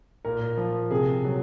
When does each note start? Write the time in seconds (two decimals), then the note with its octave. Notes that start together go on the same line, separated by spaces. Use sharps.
0.25 A#2 A#4
0.57 F3
0.91 C3 G#4
1.25 F#3